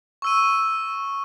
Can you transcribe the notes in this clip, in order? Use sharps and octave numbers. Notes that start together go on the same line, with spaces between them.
C#6 E6 D#7